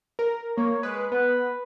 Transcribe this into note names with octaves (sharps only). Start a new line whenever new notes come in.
A#4
A#3 C#5
G#3 B4
B3 B4